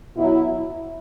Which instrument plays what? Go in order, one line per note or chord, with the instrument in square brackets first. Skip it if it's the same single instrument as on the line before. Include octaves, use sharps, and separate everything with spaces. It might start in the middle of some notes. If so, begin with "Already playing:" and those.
[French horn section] B2 F#3 E4